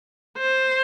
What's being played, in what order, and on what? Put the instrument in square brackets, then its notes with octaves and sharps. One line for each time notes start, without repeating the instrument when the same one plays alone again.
[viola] C5